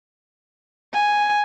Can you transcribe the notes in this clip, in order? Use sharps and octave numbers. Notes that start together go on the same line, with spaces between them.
G#5